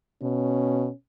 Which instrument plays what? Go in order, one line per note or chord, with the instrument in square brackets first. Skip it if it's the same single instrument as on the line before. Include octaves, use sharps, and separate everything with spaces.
[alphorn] B2 [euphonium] C#4